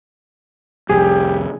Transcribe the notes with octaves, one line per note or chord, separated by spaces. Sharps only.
C2 F2 G4 G#4